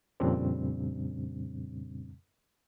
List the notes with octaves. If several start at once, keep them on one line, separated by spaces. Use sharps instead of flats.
F2 A#2 C#3 G3 C4 D4